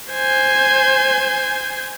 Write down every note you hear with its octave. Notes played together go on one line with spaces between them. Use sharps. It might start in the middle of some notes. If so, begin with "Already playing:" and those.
C5 G#5